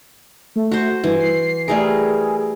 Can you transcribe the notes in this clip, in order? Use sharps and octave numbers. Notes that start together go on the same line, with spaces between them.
A3
F#4 C5
G2 E3
C7
G3 A3 G#4 A#4